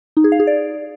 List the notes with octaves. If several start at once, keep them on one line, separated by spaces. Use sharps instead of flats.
D#4
G#4
F5
G#4
D5